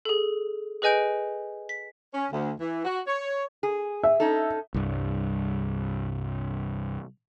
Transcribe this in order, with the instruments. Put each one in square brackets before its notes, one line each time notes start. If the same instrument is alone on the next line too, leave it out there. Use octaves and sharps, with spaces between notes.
[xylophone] G#4 A4
G#4 B4 D#5 G#5 G6 D7
B6
[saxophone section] C#4
D2
E3
F#4
C#5
[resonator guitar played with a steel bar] G#4
[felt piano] E5
[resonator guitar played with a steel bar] C#4 D#4 A4
[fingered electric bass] C2 G2